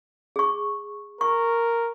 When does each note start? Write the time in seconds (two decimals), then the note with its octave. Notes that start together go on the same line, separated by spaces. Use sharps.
0.36 G#4 C#6
1.21 A#4 C#6